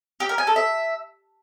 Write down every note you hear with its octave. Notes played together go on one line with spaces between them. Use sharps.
G4
A#4
G#5
A4
E5